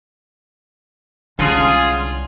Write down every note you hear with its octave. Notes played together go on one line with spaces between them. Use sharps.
C2 D3 G#3 C#4 F4 G#4